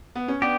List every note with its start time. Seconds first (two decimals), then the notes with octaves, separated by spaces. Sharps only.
0.15 B3
0.28 C#4
0.42 B3 D4 G4